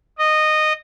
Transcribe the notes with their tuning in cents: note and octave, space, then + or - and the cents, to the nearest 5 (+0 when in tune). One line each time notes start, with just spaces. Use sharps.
D#5 -15